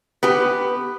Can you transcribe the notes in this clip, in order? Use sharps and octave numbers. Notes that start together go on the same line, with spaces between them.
B3 G4